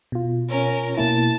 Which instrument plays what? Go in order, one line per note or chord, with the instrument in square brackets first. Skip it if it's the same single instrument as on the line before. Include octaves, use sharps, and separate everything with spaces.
[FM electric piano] B2 F4
[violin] C#4 A#4
[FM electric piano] B2 A#3 E4 [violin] A5